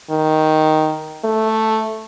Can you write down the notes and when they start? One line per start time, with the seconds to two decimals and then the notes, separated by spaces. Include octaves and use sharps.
0.10 D#3
1.24 A3